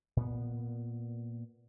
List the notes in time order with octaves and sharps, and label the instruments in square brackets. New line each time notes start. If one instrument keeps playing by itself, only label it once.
[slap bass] A#2 B3